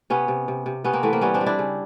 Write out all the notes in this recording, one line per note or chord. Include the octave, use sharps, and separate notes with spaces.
C3 B3 C#4
C3
C3
C3
C3 B3 C#4
A#3 C4
E3 A3 B3
A#3 C4
G3 B3 C#4
C4 D4
G3
D4 E4
C#3